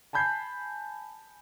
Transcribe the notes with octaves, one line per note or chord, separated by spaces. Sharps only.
G#5 A5 B5 G6 G#6 C7